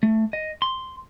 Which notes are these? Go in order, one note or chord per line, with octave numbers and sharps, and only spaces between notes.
A3
D#5
C6